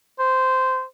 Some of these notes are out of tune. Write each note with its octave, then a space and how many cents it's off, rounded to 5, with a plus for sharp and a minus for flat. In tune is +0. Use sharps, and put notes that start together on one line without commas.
C5 -15